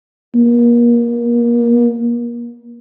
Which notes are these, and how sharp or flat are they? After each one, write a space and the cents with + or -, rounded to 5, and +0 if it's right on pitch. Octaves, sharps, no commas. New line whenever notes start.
A#3 +30